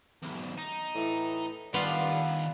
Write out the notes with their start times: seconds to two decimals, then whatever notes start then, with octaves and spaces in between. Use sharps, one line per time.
0.23 B1 E2
0.58 D#4
0.95 A2 E3
1.74 D#3 G3 B3 D4 F4 F5 F#5